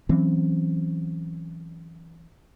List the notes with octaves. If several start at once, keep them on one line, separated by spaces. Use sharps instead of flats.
E3 F#3 C4 C#4